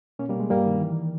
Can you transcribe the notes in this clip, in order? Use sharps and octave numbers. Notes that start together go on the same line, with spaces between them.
B2 A#3 C#4
G3 A#3
B2 G#3
G2 G3 A#3
D#3
E3